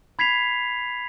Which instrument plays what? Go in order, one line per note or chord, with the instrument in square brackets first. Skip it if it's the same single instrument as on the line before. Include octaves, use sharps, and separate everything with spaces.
[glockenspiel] B5 G#6 B6 C7 F7